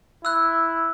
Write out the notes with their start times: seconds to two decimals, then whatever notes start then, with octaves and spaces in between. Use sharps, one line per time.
0.25 E4 E6 F#6